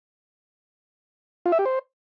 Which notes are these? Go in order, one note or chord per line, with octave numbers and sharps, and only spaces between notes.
F4
E5
G4
C5